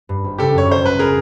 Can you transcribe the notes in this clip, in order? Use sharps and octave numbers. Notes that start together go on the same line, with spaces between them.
G2
G#1
C#3 G4 A4
F#2 C#5
C#3 C5
F#3 B4
G#4 A#4